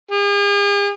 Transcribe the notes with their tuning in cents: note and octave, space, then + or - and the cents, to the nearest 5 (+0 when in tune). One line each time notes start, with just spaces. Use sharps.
G#4 -45